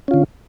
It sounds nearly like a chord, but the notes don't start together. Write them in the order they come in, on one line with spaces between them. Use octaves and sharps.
C#4 F4 D3